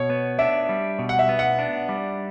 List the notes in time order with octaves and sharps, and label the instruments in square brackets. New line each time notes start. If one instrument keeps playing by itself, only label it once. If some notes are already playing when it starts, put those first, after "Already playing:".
Already playing: [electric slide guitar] B2 [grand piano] C#5
[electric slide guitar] B3
[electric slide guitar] D4 [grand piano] E5
[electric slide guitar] G3
B2
[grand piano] F#5
E5
[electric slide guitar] B3
[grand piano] F#5
[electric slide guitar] D4
G3